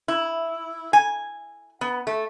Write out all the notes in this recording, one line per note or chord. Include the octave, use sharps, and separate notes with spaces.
E4
G#5
B3
A3